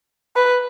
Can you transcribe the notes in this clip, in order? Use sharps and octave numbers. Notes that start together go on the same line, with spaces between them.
B4